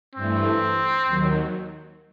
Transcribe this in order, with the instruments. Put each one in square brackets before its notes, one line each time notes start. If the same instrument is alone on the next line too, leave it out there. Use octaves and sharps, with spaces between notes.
[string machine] G2 E3 A3 [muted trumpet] C4
[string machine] D#2 D#3 F#3